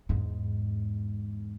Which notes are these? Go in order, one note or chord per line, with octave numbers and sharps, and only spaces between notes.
E2 G#2